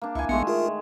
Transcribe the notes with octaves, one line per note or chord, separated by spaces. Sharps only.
A#3 D4
C#2 E4 G#5
A#1 D#3 G#3 A3 B3 C#7
F4 G#4 A#4